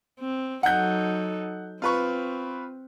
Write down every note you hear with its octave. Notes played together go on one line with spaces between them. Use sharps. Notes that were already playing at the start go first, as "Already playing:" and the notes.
C4
F#3 D#4 A4 F#5 G6
C4 F4 B4 C#6